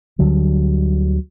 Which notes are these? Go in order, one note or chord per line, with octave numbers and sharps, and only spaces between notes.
D2 D3 F#3 G3